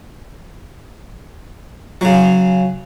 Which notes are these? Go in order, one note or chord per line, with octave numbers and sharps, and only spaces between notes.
C#3 F#3